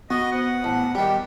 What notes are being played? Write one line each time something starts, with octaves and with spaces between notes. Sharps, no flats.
B3 F#4 D#5 D#6
C5 F#5
A1 A5
D#3 G3 G4 G5